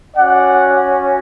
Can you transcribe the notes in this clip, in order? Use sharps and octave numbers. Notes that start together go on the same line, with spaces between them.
C#4 F#4 D5 F#5